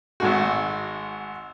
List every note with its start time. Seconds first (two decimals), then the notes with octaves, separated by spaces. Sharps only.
0.20 G#1 G#2 F#4